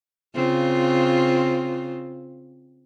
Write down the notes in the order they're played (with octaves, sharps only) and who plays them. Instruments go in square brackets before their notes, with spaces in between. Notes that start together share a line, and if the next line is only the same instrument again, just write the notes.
[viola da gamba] C#3 C4 F4